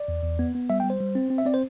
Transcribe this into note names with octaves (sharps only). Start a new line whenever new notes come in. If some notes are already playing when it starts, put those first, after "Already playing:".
Already playing: D5
E2
E2
B3
B3
G3 E5
G5
G3
C5
G3
C4
C4
E5
C4 D5
C5